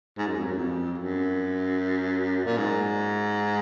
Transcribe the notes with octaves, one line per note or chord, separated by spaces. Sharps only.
G#2
F#2
F2
F#2
F2
F#2
A#2
G#2